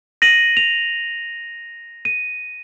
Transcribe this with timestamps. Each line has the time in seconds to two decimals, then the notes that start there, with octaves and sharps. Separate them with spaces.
0.22 A#6 D#7 F#7
0.57 F7
2.05 D#7